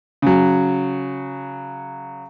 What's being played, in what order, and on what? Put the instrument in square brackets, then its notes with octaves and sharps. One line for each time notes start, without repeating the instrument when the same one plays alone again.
[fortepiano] C#3 F#3